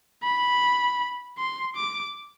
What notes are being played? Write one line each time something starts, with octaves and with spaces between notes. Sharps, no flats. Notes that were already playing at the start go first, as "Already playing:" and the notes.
B5
C6
D6